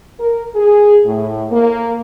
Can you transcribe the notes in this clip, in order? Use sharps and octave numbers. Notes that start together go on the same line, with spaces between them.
A#4
G#4
A2
A#3